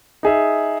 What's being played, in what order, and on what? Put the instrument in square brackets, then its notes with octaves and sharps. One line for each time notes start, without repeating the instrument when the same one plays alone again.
[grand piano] D#4 G#4 E5